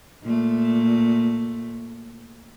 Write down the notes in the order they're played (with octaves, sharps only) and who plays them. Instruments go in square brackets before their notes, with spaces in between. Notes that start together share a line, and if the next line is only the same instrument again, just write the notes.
[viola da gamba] A#2 A3